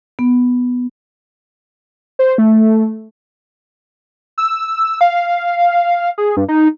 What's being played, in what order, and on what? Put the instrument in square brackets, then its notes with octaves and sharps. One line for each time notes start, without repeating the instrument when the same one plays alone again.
[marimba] B3
[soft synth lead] C5
A3
[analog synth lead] E6
F5
G#4
G2
D#4